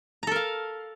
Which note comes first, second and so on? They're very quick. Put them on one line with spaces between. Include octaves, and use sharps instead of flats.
A#5 A4 A#4 F5